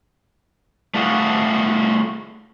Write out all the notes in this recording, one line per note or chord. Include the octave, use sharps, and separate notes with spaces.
A3 F4 F#4 G#4 A4